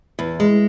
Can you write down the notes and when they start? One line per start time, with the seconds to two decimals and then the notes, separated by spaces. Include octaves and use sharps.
0.19 E2
0.40 G#3